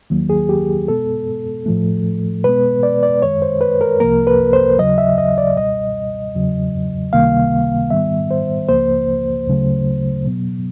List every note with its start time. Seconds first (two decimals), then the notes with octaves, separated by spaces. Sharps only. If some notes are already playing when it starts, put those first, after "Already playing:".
0.10 D#2 D#3 F#3 A#3
0.30 G#4
0.49 G4
0.88 B2 G#3 B3 A4
1.66 A2 F3 A3
2.44 B2 G#3 B3 B4
2.83 D5
3.03 D5
3.22 F#2 D#3 G#3 C#5
3.42 C5
3.61 B4
3.81 A#4
4.00 C2 C3 F3 A#3 A#4
4.27 B4
4.53 C5
4.79 D#2 C#3 F#3 D#5
4.98 E5
5.18 D#5
5.38 D5
5.56 C#2 B2 G3 D#5
6.35 E2 C#3 F#3
7.13 C#2 C3 D#3 G3 A#3 F5
7.90 G#2 D#3 G3 B3 E5
8.31 C5
8.68 C#2 C#3 F3 A#3 C5
9.47 D2 C#3 F#3 A3
10.25 B2 F#3 B3